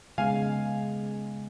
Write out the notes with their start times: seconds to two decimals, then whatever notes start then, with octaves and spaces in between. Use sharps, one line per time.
0.18 C#3 G#3 B3 F5 G#5